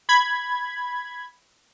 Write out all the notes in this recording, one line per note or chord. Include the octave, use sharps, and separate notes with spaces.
B5 G#6